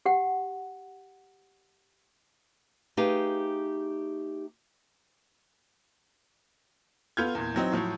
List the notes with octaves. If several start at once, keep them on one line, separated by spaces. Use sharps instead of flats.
G4 F#5 G5
A3 D#4 G4 G#4 B4 F5
B3 F4 A4 F6 G6 G#6
E2 A#2
E3 F#3 C4 D#4
A2 F3 F#3